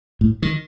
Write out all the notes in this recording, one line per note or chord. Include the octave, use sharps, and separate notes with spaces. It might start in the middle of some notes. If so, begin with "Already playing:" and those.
A2
D#3